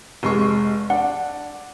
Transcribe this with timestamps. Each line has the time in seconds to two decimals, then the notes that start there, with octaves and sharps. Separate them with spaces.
0.23 F1 G#3 C#6
0.90 D4 F#5